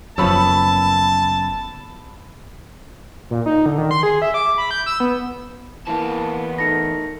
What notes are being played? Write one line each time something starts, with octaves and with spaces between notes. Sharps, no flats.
F#1 F#2 F3 B3 C#5 A5 B5 E6
A#2
D#4
D3
D#3
C6
G#4
E5
D6
B5
G6
E6
B3
E2 E3 A#3 B3 A5
A3 D#4 A#4 A#6 C#7